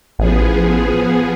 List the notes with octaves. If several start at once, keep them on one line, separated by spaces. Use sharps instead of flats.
A1 F3 B3 G#4